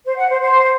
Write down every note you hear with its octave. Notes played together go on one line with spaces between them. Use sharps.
C5
F#5
C5
C5